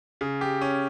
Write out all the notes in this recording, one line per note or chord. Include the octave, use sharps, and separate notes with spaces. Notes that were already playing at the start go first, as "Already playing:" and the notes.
C#3
G4
C#4